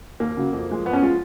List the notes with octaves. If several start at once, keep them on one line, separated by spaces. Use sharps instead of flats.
D#2 A#3
C#3 F#3
F2
F3 G#3
F2 B3
C#4
F3 G#3 F4